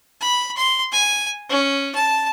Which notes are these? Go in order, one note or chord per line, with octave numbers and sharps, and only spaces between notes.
B5
C6
G#5
C#4
A5